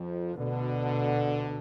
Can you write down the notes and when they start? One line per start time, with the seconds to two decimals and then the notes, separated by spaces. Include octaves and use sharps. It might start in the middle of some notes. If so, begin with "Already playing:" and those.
Already playing: F2 F3
0.36 D2 B2 D3